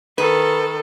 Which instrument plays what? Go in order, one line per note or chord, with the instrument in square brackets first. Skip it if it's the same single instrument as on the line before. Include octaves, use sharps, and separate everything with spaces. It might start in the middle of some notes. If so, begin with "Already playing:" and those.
[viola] D#3 A4 [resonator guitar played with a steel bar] B4